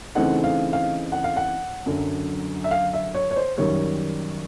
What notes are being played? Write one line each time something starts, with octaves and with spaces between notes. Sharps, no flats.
C#3 E3 A3 C4 D#4 F#5
F5
F5
F#5
F5
F#5
F#2 D3 F#3
E5
F5
E5
C#5
C#5
C5
F#2 D#3 G3 C#5